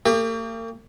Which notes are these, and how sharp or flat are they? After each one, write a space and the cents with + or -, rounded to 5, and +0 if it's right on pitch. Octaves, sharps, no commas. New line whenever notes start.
A#3 -45 G4 +35